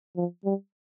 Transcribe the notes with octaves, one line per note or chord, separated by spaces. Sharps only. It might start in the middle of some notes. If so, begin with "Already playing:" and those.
F3
G3